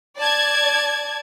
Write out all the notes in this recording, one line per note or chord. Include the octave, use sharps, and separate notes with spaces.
D5 A5 G#6